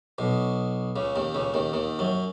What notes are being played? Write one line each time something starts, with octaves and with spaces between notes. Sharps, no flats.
B1 B2
C#2 C#3
D#2 D#3
C#2 C#3
D#2 D#3
D#2 D#3
F#2 F#3